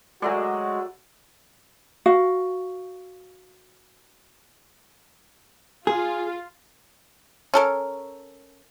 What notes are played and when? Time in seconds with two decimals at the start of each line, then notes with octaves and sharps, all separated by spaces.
0.22 F#3 G#3 A3 F#4 D5
2.06 F#4 F5
5.87 F4 G#4
7.54 C#4 A4 A#4